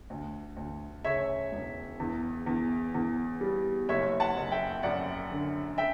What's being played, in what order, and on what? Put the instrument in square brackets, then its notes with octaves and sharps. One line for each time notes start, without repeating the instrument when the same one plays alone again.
[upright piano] D2
D2
C#3 C#5 E5
E1
E2
E2
E2
G3
F#1 C#5 E5
F#5 A5
F#1
E5 G5
F#2 D5 F#5
D3
E5 G5